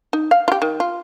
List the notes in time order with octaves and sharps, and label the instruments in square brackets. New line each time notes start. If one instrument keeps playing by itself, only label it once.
[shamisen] D#4
F5
F4 G4
D#3
F4